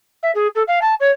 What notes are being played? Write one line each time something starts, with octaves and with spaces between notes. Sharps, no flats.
E5
G#4
A4
F5
A5
C#5